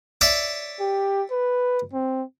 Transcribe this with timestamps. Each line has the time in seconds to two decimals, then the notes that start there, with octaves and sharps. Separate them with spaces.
0.21 C#5 D5 E5
0.80 G4
1.31 B4
1.93 C4